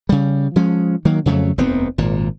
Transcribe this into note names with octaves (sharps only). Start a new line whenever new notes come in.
C#3 G3
F3 G#3 C#4
D#3 F#3 A#3
F2 C#3 F#3 A3
F1 D#2 B3 C4
G#1 A#2